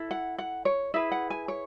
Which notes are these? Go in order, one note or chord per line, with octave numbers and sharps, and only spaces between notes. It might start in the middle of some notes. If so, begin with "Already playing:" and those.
Already playing: E4 A4
F#5
F#5
C#5
E4 G#4 B4 E5
F#5
G#5
C#5